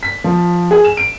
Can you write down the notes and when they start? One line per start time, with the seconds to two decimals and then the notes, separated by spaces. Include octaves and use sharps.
0.03 B6
0.24 F3
0.71 G#4
0.85 E7
0.97 D7